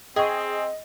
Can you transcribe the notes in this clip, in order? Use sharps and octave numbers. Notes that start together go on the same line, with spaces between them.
C4 G#4 D#5 G5 C#6